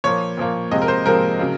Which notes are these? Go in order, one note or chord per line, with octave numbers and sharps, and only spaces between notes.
A#2 F3 A#3 C#5
A#2 F3 A#3
C3 F3 G#3 C4 D#5
A#4
C5
C3 F3 G#3 C4 A#4
C#3 F#3